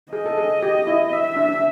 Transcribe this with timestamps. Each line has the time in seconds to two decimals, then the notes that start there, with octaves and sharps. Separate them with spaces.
0.13 G#4 D#5
0.26 A4
0.38 G#4
0.63 G4
0.87 E4
1.12 E5
1.36 D4